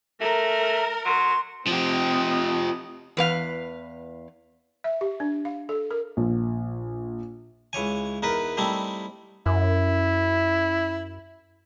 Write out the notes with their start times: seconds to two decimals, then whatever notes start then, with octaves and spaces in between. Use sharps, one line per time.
0.21 A3 A#4
1.05 F#3 C6
1.68 F3 C4 G4 D#5
3.17 E2 B4 F5
4.84 E5
5.01 G4
5.20 D4
5.45 F5
5.69 A4
5.91 A#4
6.17 A#1
7.73 C#2 E3 C#5 G#5
8.23 E2 D#4 A#4 B4
8.57 G3 A3 C4 D#4 E4
9.46 F#2 E4